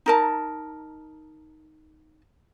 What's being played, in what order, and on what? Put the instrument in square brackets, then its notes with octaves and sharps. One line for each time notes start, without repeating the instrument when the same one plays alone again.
[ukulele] D#4 A#4 A5